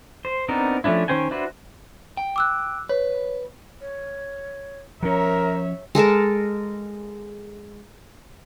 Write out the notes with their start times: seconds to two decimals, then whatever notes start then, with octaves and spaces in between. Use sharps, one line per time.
0.25 C5
0.48 B3 C4 D4 D#4 A#4
0.84 F3 A3 C#4 D4 E4
1.08 D#3 C#4 C5 G5 G#5
1.31 D4 E4 F#4 B4 C5
2.17 G5
2.36 D6 E6 F#6
2.89 B4 C#5
3.81 C#5
5.03 F3 C#4 A#4 C#5 E5 A#5
5.95 G#3 A4 A#4 A5